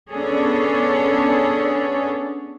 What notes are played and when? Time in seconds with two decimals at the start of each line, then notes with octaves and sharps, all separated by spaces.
0.11 B3 C#4 D4 G#4 A4 C#5